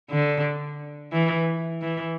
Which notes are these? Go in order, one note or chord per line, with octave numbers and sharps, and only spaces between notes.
D3
E3
E3